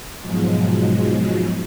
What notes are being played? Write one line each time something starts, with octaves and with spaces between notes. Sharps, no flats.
G#2 B2 F3 F#3 G#3